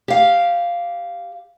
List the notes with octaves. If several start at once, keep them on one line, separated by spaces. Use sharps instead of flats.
G4 F5